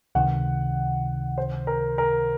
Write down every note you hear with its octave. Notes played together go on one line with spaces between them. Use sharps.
C#2 C3 D#3 F#5
C5
A#4
A#4